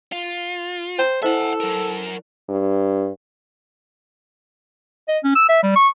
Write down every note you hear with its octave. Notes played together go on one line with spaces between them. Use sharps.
F4
C5 G5 A#5
E4 A4 C5 D#5 E5 F#5
F#3 A#4
G2
D#5
C#4
E6
E5
G3
C#6